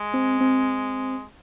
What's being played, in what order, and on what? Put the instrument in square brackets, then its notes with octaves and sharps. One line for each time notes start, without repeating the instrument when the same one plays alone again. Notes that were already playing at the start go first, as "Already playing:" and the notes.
Already playing: [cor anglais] G#3
[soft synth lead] C4
C4